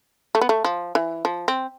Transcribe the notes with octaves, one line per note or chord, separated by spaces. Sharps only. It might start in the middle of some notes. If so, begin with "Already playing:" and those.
A3
B3
A3
F3
E3
F3
C4